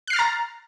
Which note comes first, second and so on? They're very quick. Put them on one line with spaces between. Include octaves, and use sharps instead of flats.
F#6 C7 F6 A6 A#5